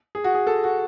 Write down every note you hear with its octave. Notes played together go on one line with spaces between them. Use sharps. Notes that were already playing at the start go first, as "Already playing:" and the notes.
G#4
F#4
G#4
A4
F#4